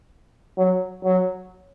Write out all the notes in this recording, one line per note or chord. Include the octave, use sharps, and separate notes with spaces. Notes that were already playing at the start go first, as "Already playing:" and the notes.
F#3
F#3